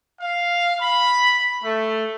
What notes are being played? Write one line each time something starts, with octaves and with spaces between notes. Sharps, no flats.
F5
B5
A3